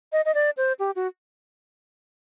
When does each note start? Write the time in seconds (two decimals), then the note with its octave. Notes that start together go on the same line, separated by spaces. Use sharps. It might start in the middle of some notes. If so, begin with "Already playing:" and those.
0.12 D#5
0.25 D#5
0.35 D5
0.57 C5
0.79 G4
0.96 F#4